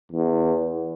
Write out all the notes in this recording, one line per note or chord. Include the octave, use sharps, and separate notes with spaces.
E2